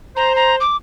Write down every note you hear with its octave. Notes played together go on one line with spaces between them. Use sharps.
C5 A#5
A#5
D6